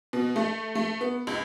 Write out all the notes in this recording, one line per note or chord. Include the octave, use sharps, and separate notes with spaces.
B2
A3
A3
B3
C#2